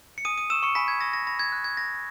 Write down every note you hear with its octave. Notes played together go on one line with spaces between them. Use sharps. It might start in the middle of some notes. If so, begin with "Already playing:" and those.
C#7
G#5 D#6 D#7
D#6 D#7
C#6 E6 E7
C#6 C#7
G#5 B5 B6
G#6
C#6 E6 A#6
A#6
B5 A#6
G#6
F#6
G#6
B5 A#6